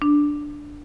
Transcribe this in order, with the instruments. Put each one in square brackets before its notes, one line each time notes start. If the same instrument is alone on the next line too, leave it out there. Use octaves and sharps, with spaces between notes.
[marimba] D4